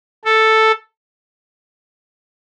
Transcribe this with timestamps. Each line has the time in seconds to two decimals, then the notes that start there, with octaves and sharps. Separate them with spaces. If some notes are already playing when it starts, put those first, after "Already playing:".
0.25 A4